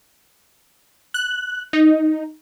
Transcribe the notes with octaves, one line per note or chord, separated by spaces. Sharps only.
F#6
D#4